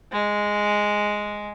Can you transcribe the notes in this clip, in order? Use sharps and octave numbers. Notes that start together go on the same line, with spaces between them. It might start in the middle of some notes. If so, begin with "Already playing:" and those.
G#3